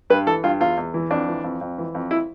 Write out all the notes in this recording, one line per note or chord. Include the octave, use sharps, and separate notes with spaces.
G2 B4
E3 A4
G2 F4
E2 F4
E2
E3
F2 D4
E3
F2
F2
E3
F2
E4